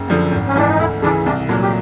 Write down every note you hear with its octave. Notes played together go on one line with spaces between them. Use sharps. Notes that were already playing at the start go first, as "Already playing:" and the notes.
Already playing: F#1
F#2 D3 F3
G#1
C#4
G#2 E3 D4
D#4
D2 E4
C#3 E3 D4
C2 D4
A#2 F#3 D4
G4